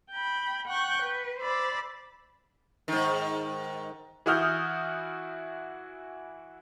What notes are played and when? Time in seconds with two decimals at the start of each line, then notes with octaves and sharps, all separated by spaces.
0.10 G5 B5
0.67 F#5 G5 C#6 F#6
1.03 B4
1.40 C5 D5 B5 E6
2.88 G#2 D#3
4.26 E3 E4 F#4 D#6 F6 G6